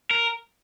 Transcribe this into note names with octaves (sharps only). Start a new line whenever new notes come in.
A#4